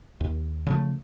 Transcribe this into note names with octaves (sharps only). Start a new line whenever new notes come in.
D#2
C#3 F3 A3